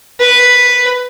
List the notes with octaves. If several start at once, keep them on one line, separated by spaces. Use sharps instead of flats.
B4